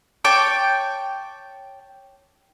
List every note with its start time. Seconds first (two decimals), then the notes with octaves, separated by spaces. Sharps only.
0.24 C#5 G5 A5 D6